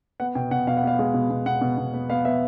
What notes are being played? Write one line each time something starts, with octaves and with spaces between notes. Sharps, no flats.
B3 F#5
B2 G5
B2 F#5
B2 F5
F#5
B3 F5
G#3
B2
B2
B2 F#5
B2
B2
B3
B3 F5
B3 E5